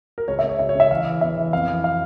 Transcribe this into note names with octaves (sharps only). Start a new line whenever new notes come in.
A#4
C#2 C#5
E5
C#2
C#5
C#3 E5
C#5
C#3 E5
E3 F5
E3
E2 E5
E3
F2 F5
E3
F5